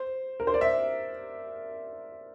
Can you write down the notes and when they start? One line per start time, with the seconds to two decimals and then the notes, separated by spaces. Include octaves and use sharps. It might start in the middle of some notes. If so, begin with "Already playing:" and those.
Already playing: C5
0.40 A#4
0.47 C5
0.54 D5
0.61 E5